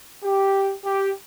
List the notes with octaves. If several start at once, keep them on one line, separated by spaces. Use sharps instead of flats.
G4
G4